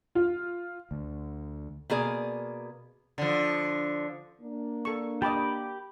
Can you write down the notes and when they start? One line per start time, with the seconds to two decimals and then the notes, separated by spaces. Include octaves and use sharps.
0.15 F4
0.91 D2
1.90 B2 A#3 G#4 D5
3.18 D3 F3
4.42 A#3 D4
4.85 A4 C#6
5.22 G4 D#5 G5 A5 B5 D6